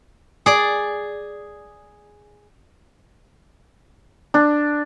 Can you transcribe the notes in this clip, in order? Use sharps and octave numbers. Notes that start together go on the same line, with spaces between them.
G#4 D5
D4